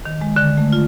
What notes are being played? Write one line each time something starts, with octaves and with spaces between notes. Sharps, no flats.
D#3
G#3
D3
A3
F4